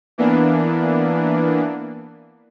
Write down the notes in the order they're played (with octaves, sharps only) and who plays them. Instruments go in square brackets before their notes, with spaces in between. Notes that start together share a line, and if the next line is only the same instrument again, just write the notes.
[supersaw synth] E3 A#3 B3 D4